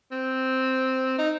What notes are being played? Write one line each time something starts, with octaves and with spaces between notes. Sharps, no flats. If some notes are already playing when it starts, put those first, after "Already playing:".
C4
D#4